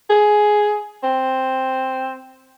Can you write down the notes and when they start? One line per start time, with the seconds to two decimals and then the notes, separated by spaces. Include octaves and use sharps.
0.10 G#4
1.04 C4